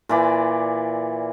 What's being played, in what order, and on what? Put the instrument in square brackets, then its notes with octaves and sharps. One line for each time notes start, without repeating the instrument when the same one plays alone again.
[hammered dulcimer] A#2 E3 D5